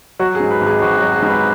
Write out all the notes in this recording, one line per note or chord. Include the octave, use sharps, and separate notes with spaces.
F#3 F#4
G#4
G#2
B4
G#1
G#4
G#1 F#4
F#4
F#3
G#4
G#2
B4